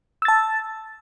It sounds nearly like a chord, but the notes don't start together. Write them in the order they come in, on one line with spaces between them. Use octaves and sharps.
E6 A6 A5